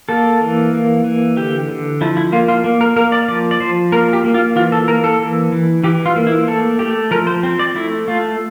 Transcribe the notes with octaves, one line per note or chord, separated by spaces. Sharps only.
A#3 A4
E3
A#3
E3
D3 G4
D3
F3 E4
E4
A#3 F4
F4
A#3
A#4
A#3 A#4
D5
F3 D5
D5
F3 C5
A#3 A#4
G4
A#3
F4
E3 F4
A4
A#3 A#4
A4
E3
E3
E3 G4
F4
A#3
E4
A3 A4
A3 G4
F3 A#4
C5
C4
D5
A3 E4
A3 F4